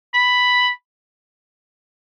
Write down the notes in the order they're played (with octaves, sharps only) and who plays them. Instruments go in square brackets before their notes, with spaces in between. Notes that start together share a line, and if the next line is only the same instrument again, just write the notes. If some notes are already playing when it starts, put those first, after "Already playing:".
[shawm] B5